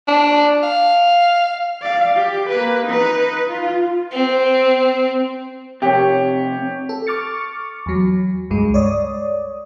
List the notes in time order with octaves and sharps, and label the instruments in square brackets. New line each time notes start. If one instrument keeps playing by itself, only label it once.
[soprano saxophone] D4
F5
[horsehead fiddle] D5 F5
G4
A#3 B4
D#4 B4
F4
[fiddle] C4
[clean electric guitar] F2 C3 [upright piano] G4 C#5
[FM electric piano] A4
C#6 D6 F6 A6 C#7
E2 F#3
C#2 G2 G#3
C#5 D5 D#6